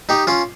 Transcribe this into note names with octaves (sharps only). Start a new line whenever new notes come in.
D#4 G4
C#4 F4